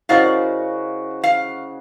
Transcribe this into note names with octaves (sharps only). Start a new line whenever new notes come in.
C#3 E4 F#4 A#4 C5 D5 D#5 F5
F5